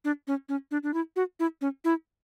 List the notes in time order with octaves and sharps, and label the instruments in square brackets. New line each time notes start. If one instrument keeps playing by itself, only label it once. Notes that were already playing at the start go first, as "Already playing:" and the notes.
[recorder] D4
C#4
C#4
D4
D4
E4
F#4
E4
C#4
E4